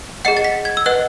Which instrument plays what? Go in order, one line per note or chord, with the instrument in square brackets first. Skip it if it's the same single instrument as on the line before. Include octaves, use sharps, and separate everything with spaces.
[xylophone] G#4 D#5 F#5 C#7
A6
B6
G#6
E6
B4 D#5 F#5 F#6